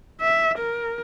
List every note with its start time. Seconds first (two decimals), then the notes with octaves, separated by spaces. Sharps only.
0.21 E5
0.58 A#4